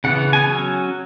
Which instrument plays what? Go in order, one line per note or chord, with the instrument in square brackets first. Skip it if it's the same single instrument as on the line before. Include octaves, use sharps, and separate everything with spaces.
[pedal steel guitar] C#3 E3 B3 F#5
G#5
F#3 C#4